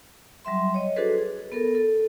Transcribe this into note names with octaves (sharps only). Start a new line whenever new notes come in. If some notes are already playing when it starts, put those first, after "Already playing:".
F#3 G3 E5 C6
C#5 D#5
D4 F#4 G#4 A4 B4 C5
G#4
B3 A4 A#4
A4